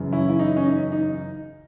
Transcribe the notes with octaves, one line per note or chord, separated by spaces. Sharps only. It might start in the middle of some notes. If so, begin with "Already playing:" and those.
Already playing: F#2 C#3 E3
C#4 E4
E4
D#4
C#4
D#4
D#4